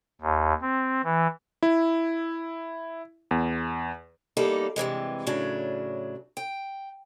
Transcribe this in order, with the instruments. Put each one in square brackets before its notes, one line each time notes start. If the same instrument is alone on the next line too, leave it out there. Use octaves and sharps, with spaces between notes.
[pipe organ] D#2
C4
E3
[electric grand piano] E4
E2
[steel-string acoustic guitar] E2 G3 A#3 D#4 A4
G2 C3 E3 G#3
A2 C#3 F#3 D4
G5